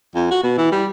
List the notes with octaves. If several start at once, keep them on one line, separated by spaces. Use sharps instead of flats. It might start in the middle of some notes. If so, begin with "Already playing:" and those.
F2
F#4
B2
E3
G3